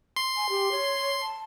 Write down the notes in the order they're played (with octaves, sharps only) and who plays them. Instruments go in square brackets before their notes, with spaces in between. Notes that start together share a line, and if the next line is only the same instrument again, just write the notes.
[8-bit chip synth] C6
[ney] G#5
G4
C#5
A5